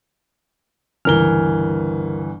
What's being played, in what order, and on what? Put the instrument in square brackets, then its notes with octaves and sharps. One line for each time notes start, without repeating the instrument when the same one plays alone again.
[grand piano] G1 E3 G7 [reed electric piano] C#2 A#4 F6